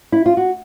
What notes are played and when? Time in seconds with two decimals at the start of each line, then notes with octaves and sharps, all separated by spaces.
0.12 E4
0.26 F4
0.37 F#4